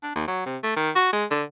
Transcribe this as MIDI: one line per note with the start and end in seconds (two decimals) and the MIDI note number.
0.03 0.11 62
0.15 0.25 39
0.28 0.42 54
0.46 0.57 48
0.63 0.73 57
0.77 0.91 51
0.96 1.12 66
1.13 1.25 56
1.31 1.43 50